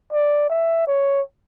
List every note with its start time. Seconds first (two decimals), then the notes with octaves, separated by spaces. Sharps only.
0.12 D5
0.50 E5
0.87 C#5